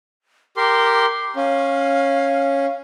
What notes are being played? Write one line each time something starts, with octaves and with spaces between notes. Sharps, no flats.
G4 A#4 C6 D6
C#4 F5